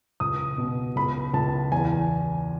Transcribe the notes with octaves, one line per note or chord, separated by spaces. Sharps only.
C#2 D#6
B2
C#2 B5
C#2 A5
E2 G#5